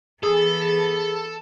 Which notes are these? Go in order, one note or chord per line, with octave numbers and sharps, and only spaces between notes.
E3 B3 G#4 A4